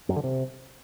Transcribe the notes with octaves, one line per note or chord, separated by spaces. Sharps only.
F#2
D3
C3